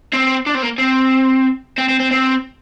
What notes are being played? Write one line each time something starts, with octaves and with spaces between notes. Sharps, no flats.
C4
D4
C4
A#3
C4
C4
C4
C4
C4